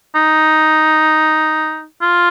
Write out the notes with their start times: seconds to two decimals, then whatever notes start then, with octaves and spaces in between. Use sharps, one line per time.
0.15 D#4
2.02 F4